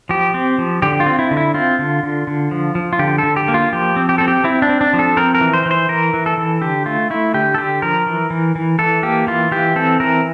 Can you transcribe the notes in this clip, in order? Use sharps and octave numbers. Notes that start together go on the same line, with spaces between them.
F3 G4
C4
F3
D3 G4
F4
C4
E4
D3
E4
C4 F4
D3
D3
D3
F3
F3
F4
D3 G4
D3 A4
G4
A#3
F4
F3 G4
C4
G4
C4 A4
G4
C4 E4
D4
C4
D4
F3
A4
C4 A#4
A#4
E3
C5
E3
C5
E3 A#4
E3
A4
E3
D3 G4
A3 F4
A3 E4
D3 G4
A4
D3 G4
F3 A#4
E3
E3
E3
E3 A4
A#3 G4
E3 F4
E3 G4
C4 A4
E3 A#4